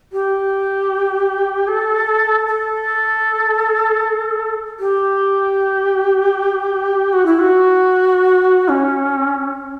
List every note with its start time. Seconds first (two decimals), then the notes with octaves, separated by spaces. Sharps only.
0.12 G4
1.67 A4
2.46 A4
4.79 G4
7.13 F#4
7.26 E4
7.39 F#4
8.68 C#4